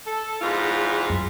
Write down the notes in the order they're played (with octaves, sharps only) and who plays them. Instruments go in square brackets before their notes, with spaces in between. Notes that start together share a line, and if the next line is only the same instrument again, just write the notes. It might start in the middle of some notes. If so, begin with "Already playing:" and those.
[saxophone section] A4
E2 G#2 F4
[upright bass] F#2